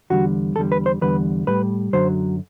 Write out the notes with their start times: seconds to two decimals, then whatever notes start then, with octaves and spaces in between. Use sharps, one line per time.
0.10 E2 D3 G3 F#4
0.56 E2 D3 G3 A4
0.72 B4
0.86 C5
1.01 E2 D3 G3 B4
1.47 A2 G3 B4
1.93 F#2 D3 F#3 C5